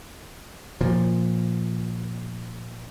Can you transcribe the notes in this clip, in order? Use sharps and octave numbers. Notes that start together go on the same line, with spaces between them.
A#2 F3